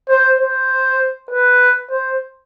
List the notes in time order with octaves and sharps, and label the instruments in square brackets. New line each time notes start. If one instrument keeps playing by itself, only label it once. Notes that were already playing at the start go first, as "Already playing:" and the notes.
[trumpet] C5
C5
B4
C5